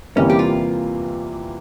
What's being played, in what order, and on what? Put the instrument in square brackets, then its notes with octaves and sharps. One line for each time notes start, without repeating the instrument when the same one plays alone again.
[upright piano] E2 C3 E3 G3 A#3 [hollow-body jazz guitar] C#4
[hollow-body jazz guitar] G4
F4